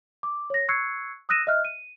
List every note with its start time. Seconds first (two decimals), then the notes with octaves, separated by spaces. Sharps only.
0.23 D6
0.50 C#5 A#6
0.69 C#6 E6 F#6 G#6 C7 C#7
1.29 D#6 E6 F#6 A#6 D#7 E7
1.47 D#5 E5 F6 F#6
1.65 D#7